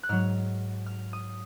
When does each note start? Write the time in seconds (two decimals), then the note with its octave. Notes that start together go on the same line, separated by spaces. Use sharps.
0.03 F#6
0.09 G#2 F#3 F6
0.86 F6
1.13 D#6